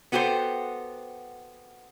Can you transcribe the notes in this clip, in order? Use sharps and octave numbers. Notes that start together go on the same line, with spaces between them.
B3 F#4 G4 A4 C5